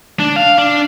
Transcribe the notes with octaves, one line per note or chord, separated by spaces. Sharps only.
D4
F5
D4